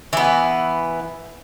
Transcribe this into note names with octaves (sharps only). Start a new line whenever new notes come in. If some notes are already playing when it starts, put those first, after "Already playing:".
E3 B3